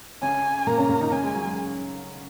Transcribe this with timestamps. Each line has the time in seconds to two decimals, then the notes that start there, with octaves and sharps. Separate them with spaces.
0.22 C#3 C#4 G#5
0.67 A#2 A#3 A#5
0.78 C#3 C#4
0.89 A#2 A#3
1.01 D#3 D#4
1.11 C#3 C#4 G#5
1.23 G#3
1.35 F#3
1.45 G#3